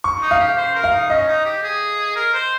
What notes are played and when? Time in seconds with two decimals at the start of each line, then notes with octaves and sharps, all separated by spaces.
0.04 C#6
0.22 D#4
0.31 F5
0.40 G4
0.58 C5
0.75 A#4
0.84 F5
0.93 D#4
1.10 C#4 D#5
1.28 D#4
1.45 G4
1.63 G#4
2.16 A#4
2.34 C5